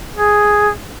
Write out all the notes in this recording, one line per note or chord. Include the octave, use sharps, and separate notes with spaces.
G#4